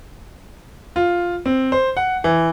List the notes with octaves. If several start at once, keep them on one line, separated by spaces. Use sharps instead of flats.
F4
C4
C5
F#5
E3